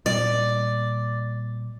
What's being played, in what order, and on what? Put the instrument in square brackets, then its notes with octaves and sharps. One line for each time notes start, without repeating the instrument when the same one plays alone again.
[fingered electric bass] A#2 G3 [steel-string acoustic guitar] D5